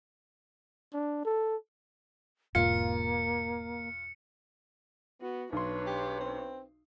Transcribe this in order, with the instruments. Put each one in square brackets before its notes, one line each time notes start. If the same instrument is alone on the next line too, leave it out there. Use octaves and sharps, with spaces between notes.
[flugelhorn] D4
A4
[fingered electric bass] E1 E2 G#2 [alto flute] A#3 [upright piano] F4 [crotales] C#7
[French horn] B3 [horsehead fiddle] F#4
[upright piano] B1 C6 [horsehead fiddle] D4 C#5 [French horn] B4
[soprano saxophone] G4
C4